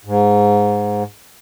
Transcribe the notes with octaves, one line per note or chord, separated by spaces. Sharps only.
G#2